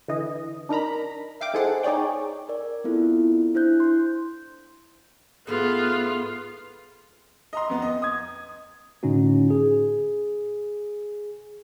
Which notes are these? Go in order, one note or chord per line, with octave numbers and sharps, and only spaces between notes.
D3 E3 D#5
D4 D#4 A#4 A#5 B5
E5 F5 G5 D6
D#4 E4 G#4 A4 C5 F#5
D#4 G#4 C#5 D5 G5
A#4 D5
B3 C4 E4 F4 A4
D4 E4 C5 F#6 G6
C6 G6
G#2 A3 B3 E4 F4
D#5 A#5 C6
F2 B3
D#5
D#6 G#6
A2 D3 C#4 D#4 F#4
G#4